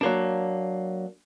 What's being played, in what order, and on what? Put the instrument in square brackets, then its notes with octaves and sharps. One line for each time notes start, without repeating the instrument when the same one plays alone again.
[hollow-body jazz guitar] F#3 A#3 D4